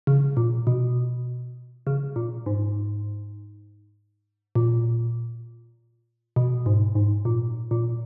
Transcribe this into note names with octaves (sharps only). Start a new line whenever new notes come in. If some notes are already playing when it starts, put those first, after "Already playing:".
C#3
A#2
B2
C#3
A#2
G#2
A#2
B2
G#2
G#2
A#2
A#2